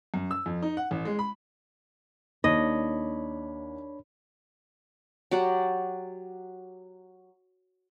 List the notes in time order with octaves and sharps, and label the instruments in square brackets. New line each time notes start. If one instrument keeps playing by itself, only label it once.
[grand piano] F#2
E6
F2
D#4
F#5
A1
G#3
B5
[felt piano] D#2 [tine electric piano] D4 C#5 B5 [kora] D#5
[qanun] F#3 G4 D5 F#5